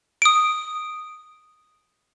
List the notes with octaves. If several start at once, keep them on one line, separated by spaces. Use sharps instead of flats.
D#6 D7